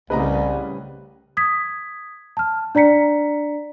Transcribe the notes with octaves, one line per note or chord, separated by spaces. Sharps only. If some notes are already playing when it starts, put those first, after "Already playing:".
C2 A2 C#3 G3 C4 B4 D#5 A#5
D#6 G#6 B6
A5 F6
D4 D5 A#5 B6 C#7